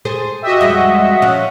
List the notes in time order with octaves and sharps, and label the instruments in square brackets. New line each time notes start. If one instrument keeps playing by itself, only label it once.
[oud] G#4 A4 C5
[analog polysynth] F#4 D#5 E5 [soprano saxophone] G4
[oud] F2 G3 G#3 [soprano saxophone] F#5
[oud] F3 C#4